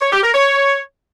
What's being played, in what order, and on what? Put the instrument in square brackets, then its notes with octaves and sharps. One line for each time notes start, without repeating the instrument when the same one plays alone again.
[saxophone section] C#5
G4
A#4
C#5